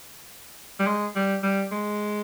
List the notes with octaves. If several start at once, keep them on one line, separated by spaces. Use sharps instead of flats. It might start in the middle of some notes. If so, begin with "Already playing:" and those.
G3
G#3
G3
G3
G#3